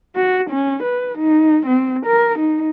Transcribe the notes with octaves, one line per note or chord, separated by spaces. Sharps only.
F#4
C#4
B4
D#4
C4
A#4
D#4